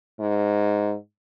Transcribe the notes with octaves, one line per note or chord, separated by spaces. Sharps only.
G#2